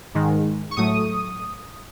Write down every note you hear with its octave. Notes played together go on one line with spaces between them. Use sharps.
G#2 D#3 G#3
C#6
A2 F#3 A3 D#6